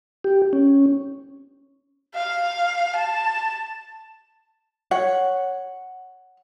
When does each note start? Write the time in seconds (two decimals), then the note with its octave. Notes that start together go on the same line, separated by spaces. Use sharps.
0.24 G4
0.53 C#4
2.15 F5
2.96 A5
4.91 C#5 F#5